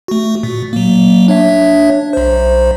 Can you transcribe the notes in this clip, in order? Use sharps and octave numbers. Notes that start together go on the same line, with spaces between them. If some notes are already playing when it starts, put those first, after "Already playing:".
A3 F#4
A#2
F#3 A#3
D4 C#5 E5
B1 C5